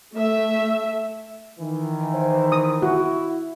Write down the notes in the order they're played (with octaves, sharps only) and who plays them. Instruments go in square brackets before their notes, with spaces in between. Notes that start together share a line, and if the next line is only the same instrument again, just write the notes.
[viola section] A3 E5
[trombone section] D#3 E3
[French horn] C5
[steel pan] D#6
[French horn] E4 [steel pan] F#4